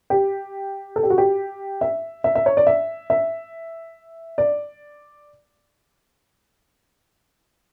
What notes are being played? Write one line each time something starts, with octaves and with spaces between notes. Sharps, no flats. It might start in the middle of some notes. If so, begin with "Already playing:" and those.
G4
A4
G4
F#4
G4
E5
E5
E5
C#5
D5
E5
E5
D5